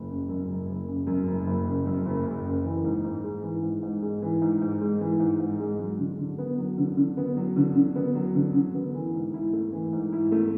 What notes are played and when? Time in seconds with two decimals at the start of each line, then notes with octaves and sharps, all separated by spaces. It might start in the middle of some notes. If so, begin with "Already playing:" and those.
Already playing: F#1
0.09 C#3
0.29 F#2
0.48 F#1
0.68 F#1
0.87 C#3
1.07 F#2
1.27 F#1
1.47 F#1
1.66 C#3
1.86 F#2
2.05 F#1
2.25 F#1
2.45 C#3
2.64 E3
2.84 G#2
3.04 G#2
3.24 G#3
3.44 E3
3.63 G#2
3.83 G#2
4.02 G#3
4.22 E3
4.42 G#2
4.61 G#2
4.81 G#3
5.01 E3
5.20 G#2
5.40 G#2
5.60 G#3
5.79 F#3
5.99 D3
6.19 D3
6.38 B3
6.58 F#3
6.78 D3
6.97 D3
7.17 B3
7.37 F#3
7.56 D3
7.76 D3
7.96 B3
8.15 F#3
8.35 D3
8.54 D3
8.75 B3
8.94 E3
9.14 G#2
9.34 E4
9.53 A3
9.73 E3
9.93 G#2
10.12 E4
10.32 A3